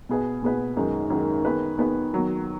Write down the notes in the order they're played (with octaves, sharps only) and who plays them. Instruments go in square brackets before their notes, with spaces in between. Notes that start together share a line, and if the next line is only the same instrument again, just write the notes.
[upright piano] B2 B3 G#4 B4
B2 B3 G#4 B4
F#2 D#3 G#3 D#4
F#2 D#3 G#3 D#4
D#3 B3 G#4 B4
D#3 B3 G#4 B4
D#3 F#3 B3